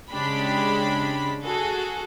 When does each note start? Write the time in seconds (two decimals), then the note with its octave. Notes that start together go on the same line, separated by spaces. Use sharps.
0.10 C#3 G#3 D4 G4 B5
1.44 F#4 G#4 A4